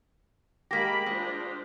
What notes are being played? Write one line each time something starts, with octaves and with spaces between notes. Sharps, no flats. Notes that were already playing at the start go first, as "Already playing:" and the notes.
G#3 A#3 G4 B5 A#6 B6
G#3 D4 F4 C5